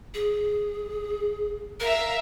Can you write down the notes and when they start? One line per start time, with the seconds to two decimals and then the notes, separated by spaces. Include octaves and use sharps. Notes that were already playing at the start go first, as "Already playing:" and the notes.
0.14 G#4
1.80 A#4 E5 F5 A#5